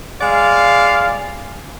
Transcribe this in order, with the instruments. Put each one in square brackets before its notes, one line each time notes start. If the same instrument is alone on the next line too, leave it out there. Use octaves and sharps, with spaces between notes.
[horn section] G#3 D5 F5